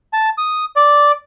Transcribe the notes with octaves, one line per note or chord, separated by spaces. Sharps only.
A5
D#6
D5